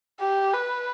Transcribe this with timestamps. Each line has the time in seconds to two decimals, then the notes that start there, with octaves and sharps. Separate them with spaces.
0.21 G4
0.53 B4